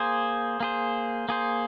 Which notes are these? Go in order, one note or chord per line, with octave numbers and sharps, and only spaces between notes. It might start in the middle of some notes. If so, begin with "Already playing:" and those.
Already playing: A#3 G#4 C5
A#3 G#4 C5
A#3 G#4 C5